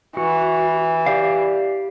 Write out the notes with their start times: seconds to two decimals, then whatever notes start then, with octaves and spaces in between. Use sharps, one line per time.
0.17 E3 F#4
1.06 G4 D5 F5